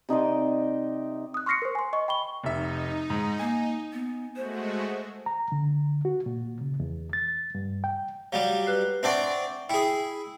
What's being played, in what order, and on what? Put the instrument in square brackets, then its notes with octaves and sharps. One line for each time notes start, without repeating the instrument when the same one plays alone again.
[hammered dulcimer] C3 D#4 D5 C6
[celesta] D#6 F#6
C6 C#6 F6 A#6 C7 C#7
A#4 C5
G#5 C6
D#5 C#6
G5 B5 C#6 G7
[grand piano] F1 E5 [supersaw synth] D#4
[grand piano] G#2
[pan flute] A#3 [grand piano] G#5
[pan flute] B3
[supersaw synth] G#3 A3 F#4 [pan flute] C5
[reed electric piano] A#5
D3
F#4
A#2
C#3
E2
A6
G2
G5
[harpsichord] F#3 G3 [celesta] F5
[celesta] B4 F#6 C7
[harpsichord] C4 D4 D5 [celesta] E5 F#5 C#6
[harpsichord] E4 G#4 [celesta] G5